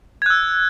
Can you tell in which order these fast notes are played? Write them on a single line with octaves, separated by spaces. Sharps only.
G#6 F#6 E6